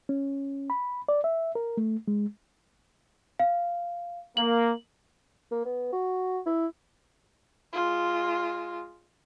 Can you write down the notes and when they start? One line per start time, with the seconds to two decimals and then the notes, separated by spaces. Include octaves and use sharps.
0.09 C#4
0.70 B5
1.09 D5
1.24 E5
1.55 A#4
1.77 A3
2.08 G#3
3.39 F5
4.37 A#3 F#7
5.51 A#3
5.65 B3
5.93 F#4
6.46 E4
7.73 G#3 F4